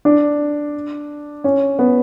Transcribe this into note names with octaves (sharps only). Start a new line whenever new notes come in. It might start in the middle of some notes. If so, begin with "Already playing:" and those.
D4
C#4
B3